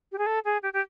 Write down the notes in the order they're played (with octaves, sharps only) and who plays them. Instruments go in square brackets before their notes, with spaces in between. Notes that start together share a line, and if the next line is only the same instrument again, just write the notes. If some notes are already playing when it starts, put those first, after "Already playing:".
[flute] G4
G#4
A4
G#4
G4
G4